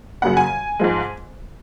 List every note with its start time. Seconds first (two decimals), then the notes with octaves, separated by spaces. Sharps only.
0.22 F#2 C#3 F#3 A#3 F#5
0.37 G#5
0.80 G#2 F3 G#3